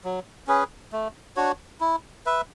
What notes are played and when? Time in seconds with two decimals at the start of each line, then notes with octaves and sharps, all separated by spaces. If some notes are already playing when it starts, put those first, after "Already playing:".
0.04 F#3
0.47 C#4 G#4 B4
0.92 A3
1.36 D4 F#4 C#5
1.80 E4
2.26 B4 E5